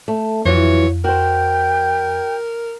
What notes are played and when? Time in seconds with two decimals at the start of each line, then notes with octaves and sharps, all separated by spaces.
0.08 A3
0.45 F2 E3 F#3 F4 C#5
1.04 F#4 A#4 C5 G5 G6